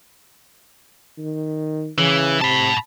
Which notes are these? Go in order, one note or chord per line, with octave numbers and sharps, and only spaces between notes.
D#3
C#3 E3
C3 A5 B5